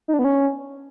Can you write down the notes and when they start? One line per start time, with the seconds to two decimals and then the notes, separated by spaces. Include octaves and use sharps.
0.08 D#4
0.13 D4
0.19 B3
0.24 C#4